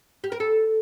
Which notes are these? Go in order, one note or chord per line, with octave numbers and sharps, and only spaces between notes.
G4
A#4
A4